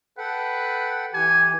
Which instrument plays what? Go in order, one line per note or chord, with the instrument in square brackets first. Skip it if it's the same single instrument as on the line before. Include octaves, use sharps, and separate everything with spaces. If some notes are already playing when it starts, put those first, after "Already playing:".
[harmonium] A4 F#5 G5 [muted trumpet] B4
[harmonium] E3 G4 [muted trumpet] G#5